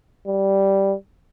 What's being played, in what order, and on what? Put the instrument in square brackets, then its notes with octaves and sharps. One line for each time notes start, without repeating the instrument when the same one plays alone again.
[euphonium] G3